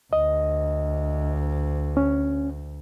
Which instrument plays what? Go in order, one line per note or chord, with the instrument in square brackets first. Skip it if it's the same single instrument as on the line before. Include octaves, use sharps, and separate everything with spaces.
[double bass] D2 [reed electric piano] D#5
[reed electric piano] C#4